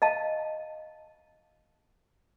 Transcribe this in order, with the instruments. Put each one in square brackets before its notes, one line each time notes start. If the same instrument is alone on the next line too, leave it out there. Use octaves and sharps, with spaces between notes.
[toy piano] D#5 F5 A5